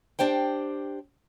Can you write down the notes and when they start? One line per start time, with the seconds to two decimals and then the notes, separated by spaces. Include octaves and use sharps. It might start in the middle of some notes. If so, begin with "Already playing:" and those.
0.19 D4 G4 C5 G5